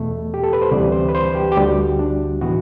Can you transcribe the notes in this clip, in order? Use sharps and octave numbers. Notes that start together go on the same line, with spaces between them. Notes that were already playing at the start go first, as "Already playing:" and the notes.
Already playing: E2 B2 A3
G4
A4
B4
C5
D2 C3 E3 G3 D5
C5
B4
C5
G4
G4
D2 D3 G3 F#4
D4
A2 E3 B3 F#4